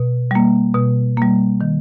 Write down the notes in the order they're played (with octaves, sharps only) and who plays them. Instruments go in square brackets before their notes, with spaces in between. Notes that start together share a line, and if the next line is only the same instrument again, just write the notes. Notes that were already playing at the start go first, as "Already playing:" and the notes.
Already playing: [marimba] B2
G3 A#3
B2
G3 A#3
D#3